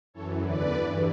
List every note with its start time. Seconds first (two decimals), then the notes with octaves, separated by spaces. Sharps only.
0.14 F#2 E3 A4 C#5
0.42 E2 D3 B4 D5
0.72 G2 E3